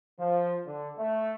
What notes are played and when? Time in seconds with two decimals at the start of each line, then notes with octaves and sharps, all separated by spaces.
0.19 F3
0.67 D3
0.98 A3